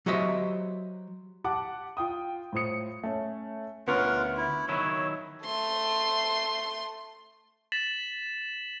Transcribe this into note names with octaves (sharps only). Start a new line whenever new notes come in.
F#3 F#4 G4 C5 D#5 E5
G4 F#5 A5 D6
F4 G5 D#6
A2 F4 C5 D#6 C#7
A3 C#4
D2 B3 C#4 F4 A#4 F#5
E4
D#3 F#3 E4 C#5
A3 C6
A6 B6 E7 F#7